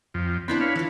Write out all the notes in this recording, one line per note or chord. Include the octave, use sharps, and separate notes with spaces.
F2
B3 C4 D4 E4 B5
B4 C#5 F5
E3 D4 F4